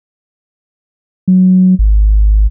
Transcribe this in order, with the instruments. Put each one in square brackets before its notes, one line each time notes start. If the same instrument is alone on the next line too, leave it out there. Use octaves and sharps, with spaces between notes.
[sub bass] F#3
G#1